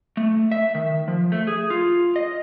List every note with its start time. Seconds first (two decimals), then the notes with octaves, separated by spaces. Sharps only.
0.17 A3
0.52 E5
0.75 D#3
1.08 F3
1.32 A3
1.47 G#4
1.70 F4
2.16 D#5